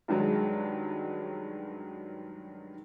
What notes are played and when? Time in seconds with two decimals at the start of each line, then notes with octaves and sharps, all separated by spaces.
0.08 G2 D#3 F#3 G#3